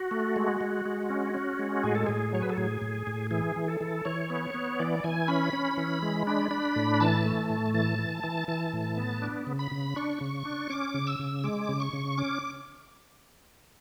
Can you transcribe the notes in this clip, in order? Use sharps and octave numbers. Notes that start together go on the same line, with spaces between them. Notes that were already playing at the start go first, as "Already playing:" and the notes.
Already playing: F#4
A3
G#3
G#3
G#3
C#4
C#4
G#3
A2 G#4
A4
A2 G#4
F#3 C#5
B4
A4
A2 G#4
A2
A2
E3 G#4
E3
A4
E3
E3 C#5
B3
B3
E3 D5
E3 G#5
C#4 B5
C#4
E3
G#3
D4 B5
D4
A2
E3 A5
A3
A2
E3 A5
E3
E3
E3 A5
A2
B3
D4
C#3
B5
C#3
D4 C#6
C#3
D4
C#4 D6
C#3
E6
C#3
G#3 D6
C#3
C#6
C#3
C#4 D6